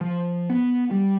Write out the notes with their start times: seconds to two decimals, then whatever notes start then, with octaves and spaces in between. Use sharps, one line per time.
0.01 F3
0.50 B3
0.91 G3